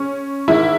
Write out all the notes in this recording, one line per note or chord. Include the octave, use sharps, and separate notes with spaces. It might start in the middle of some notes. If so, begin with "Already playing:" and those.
Already playing: C#4
G#2 D#3 G#3 E4